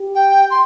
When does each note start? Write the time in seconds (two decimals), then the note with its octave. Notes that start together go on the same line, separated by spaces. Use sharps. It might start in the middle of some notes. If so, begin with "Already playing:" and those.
Already playing: G4
0.15 G5
0.50 C6